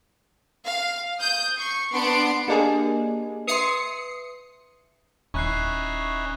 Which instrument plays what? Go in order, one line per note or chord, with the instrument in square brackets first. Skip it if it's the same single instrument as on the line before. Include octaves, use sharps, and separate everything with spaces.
[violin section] F5
D#6 G6
C#6 C7
B3 D4 F#5 C6 C7 D7
[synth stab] A#3 D4 G#4 [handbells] G4 D#5 G#5
[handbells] B4 E5 C6 [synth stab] D#6 C7 C#7
[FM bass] D#1 [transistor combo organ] C#4 D#4 E4 [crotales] C#6 F#6 C7